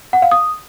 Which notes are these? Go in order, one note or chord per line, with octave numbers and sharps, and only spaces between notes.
F#5
F5
D#6